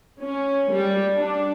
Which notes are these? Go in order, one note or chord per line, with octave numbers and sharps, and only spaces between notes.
C#4
G3
D4